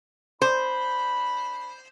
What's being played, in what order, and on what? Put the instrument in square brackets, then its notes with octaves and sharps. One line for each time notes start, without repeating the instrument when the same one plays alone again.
[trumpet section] D4 B5 [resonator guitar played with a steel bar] C5